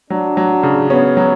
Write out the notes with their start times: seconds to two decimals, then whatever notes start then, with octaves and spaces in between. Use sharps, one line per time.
0.10 F#3 D4
0.37 F#3
0.63 C#3
0.90 B3 C#4
1.17 F#3